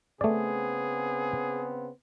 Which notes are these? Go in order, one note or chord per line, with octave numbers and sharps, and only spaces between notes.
C#3 A3 B3 C4 G#4 D5